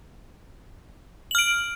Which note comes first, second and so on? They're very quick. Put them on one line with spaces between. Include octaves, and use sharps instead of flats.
F#7 F6 D7